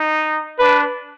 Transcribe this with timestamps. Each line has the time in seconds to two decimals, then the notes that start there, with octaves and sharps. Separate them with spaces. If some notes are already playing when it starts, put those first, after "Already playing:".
Already playing: D#4
0.59 D4 B4